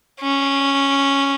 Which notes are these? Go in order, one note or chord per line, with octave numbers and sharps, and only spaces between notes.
C#4